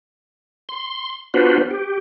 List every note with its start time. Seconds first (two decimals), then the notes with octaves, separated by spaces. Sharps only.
0.69 C6
1.34 B3 D4 F4 F#4 B4 C5
1.71 G4